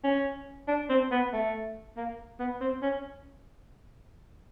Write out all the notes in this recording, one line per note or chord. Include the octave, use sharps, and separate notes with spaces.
C#4
D4
C4
B3
A3
A#3
B3
C4
C#4